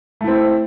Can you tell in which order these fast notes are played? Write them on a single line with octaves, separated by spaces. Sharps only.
A3 E4 C4